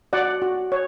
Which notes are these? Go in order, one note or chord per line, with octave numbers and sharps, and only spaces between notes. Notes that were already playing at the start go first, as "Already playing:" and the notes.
F#4 D5 F#5
F#4
C#5